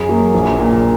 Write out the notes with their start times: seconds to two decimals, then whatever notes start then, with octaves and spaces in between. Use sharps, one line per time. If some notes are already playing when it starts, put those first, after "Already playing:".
Already playing: F#2 G#4
0.09 F#3 A#3
0.34 A#1
0.58 A#2 A#3